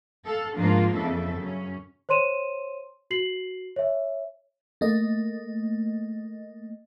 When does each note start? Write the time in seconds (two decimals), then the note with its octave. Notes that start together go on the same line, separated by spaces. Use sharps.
0.25 A4 F5
0.58 G#2 F3 A#3 D4 F4 A#4
0.97 F2 C#3 A4 E5
1.39 F#2 C#4
2.09 C5 C#5 C6 D#7 E7
3.11 F#4 C7 F#7
3.76 C#5 E5
4.81 A3 A#3 D#5